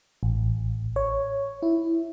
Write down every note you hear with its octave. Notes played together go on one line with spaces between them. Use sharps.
A1
C#5
E4